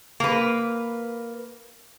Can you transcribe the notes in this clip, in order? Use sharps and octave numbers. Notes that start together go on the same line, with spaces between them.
A#3 B4